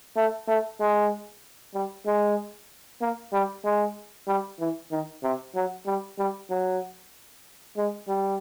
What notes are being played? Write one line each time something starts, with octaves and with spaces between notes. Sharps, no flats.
A3
A3
G#3
G3
G#3
A#3
G3
G#3
G3
E3
D#3
C3
F#3
G3
G3
F#3
G#3
G3